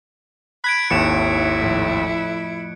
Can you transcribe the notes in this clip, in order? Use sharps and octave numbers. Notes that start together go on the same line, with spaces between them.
B5 F#6 G#6 D7
G#1 D#2 E4 A4 C#5 C#7 E7
F2 A2